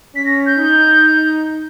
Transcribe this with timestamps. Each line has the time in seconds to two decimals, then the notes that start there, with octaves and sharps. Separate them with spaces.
0.15 C#4 B6
0.25 A#6
0.46 G6
0.57 D#4